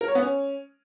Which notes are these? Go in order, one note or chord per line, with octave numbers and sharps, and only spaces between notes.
A#4
C#5
B3
C#4